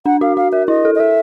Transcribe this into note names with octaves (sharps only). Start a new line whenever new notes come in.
D4 F#5
F#4 F5
F#4 F5
A#4 E5
E4 D#5
A4
D#5
A4 E5